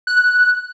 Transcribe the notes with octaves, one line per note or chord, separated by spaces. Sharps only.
F#6